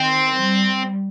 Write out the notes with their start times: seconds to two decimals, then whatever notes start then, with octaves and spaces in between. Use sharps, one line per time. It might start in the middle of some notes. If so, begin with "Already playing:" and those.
Already playing: D#3 C4
0.40 G3